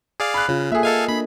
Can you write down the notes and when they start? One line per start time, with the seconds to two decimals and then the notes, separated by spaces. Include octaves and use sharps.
0.20 G#4 D5 F5
0.34 B5 F#6
0.49 C#3 F4 F5
0.72 A#3 G#4 A4 E5
0.83 A4 D#5 F5 G#5
1.09 A#3 D4 B5